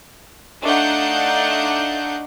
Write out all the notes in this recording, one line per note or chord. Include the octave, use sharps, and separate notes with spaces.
A3 D4 D#4 F5 F#5 G6